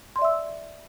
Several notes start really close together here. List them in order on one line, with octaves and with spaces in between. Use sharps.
C6 D5 E5 E6